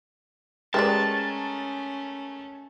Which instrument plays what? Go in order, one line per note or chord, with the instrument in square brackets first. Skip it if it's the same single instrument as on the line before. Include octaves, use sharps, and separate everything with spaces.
[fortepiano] G#3 A#4 [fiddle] A3 C#4 [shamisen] G4 B4 D5 [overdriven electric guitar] A5